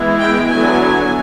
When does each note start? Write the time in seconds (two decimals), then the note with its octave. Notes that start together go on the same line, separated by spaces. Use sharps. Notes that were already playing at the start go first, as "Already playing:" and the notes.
Already playing: E3 G#3 B3 E4
0.18 G5
0.48 D3 F#3 B3 E4 G#5